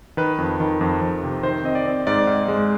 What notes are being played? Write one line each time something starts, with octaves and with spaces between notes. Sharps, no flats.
D#3 B4
F2
D#3
F2
F2
C3
D#3 C5
C4 D#5
D5
C4
G#2 D5
G#2
G#3